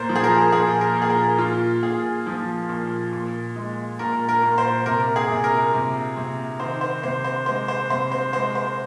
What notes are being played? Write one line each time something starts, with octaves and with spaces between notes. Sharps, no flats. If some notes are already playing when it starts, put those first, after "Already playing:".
Already playing: A#2 A#4 C5
F3
G#4
A#4
A#2 G#4
A#4
A#2
G#4
A#4
A#2 F4
A#2 G#4
F3
A#2
A#2
G#3
A#2 A#4
A#4
A#2
C5
C3 A#4
G#4
C3
A#4
C3
C3
D#3 C5
C5
C3 C5
C5
G#3 C5
C5
C3 C5
C5
G#3 C5
C5